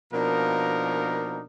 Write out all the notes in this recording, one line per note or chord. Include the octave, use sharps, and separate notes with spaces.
B2 F3 A#3 D4 D#4 A#4